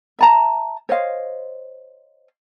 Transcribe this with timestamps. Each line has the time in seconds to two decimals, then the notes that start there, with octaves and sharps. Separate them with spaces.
0.19 E5 A5 A#5
0.89 C5 C#5 D#5 F5